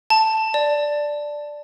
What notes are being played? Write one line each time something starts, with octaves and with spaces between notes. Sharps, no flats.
A5
D5